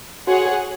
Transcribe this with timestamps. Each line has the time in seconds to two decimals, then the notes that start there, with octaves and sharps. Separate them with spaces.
0.27 F#4 G#4 C#5 F#5